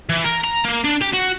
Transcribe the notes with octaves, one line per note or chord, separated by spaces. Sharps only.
E3
A#4
A#5
A#3
D4
G4
F#4